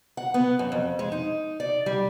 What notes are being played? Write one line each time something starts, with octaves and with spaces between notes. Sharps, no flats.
F#5
B3
F#2
F2
G#3
D#4
D5
G3